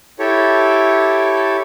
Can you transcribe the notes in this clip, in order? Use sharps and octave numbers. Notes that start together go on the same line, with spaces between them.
E4 G4 A4 C#5